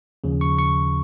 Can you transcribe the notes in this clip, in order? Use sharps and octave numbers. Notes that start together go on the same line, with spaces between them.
D#2 C#3 F3
C#6
C#6